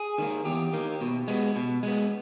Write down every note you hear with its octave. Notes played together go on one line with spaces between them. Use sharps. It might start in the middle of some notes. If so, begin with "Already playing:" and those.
Already playing: G#4
D#3 A#3
E2 G4
D#3 A#3
B2
G#3 B3
B2
G#3 B3